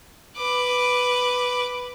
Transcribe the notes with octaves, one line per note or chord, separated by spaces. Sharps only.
B4 D6